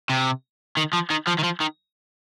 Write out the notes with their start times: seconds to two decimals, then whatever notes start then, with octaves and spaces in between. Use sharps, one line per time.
0.09 C3
0.77 D#3
0.93 F3
1.10 D#3
1.28 F3
1.39 D#3
1.44 F3
1.61 D#3